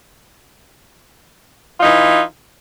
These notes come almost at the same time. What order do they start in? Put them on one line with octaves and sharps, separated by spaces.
F4 D#4 E3